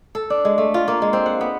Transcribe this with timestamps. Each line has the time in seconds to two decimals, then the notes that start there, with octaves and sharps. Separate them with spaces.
0.15 A4
0.30 D4
0.45 G#3
0.58 A3
0.74 F4
0.88 A#3
1.02 G#3
1.13 C4
1.26 F#5
1.41 B3